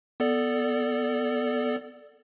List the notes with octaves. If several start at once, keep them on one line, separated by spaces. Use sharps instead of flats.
B3 A4 D5